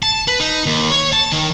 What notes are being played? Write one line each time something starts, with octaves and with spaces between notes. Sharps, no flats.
A5
B4
D#4
D#2
C#5
A5
D#3